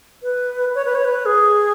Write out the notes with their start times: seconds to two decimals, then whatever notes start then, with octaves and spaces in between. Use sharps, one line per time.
0.23 B4
0.75 C#5
0.85 B4
0.95 C#5
1.05 B4
1.26 G#4